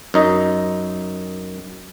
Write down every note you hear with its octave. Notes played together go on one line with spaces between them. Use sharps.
F#2 D#4 D#5